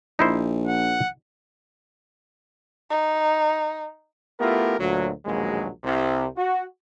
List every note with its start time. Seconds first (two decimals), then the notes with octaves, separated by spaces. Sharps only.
0.19 A#1 D#4 E4 C5
0.68 F#5
2.90 D#4
4.40 A3 B3 E4 F4 G4 A#4
4.79 D2 A#2 F#3
5.26 A#1 D#2 B2 F#3 G#3
5.84 C2 C3
6.37 F#4